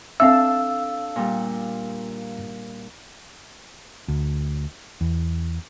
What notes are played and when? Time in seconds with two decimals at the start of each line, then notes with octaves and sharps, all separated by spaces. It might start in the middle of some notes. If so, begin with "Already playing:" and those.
0.20 C4 D4 A4 E5 F5 E6
1.16 A#2 G3
4.08 D2
5.01 E2